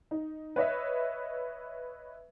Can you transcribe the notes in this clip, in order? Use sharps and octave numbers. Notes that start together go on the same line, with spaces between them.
D#4
B4 C#5 D#5 E5